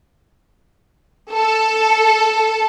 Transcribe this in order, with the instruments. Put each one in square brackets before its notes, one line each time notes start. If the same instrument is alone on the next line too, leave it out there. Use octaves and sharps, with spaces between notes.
[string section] A4